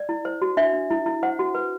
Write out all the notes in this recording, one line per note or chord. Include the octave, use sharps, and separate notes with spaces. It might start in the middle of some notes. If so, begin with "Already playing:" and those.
Already playing: D5
E4
C5
F#4
D4 E5
D4
E4
E4
C5 F#5
F#4
B4